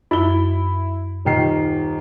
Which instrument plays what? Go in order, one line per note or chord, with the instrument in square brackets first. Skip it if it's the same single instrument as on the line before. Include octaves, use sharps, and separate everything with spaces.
[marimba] F#2 E6 [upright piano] E4 G7
[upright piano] D#1 D#3 C7